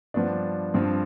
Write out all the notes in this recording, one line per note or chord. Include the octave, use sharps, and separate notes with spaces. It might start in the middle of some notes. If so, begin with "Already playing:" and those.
G2 F3 B3 D4
G2 F3 C4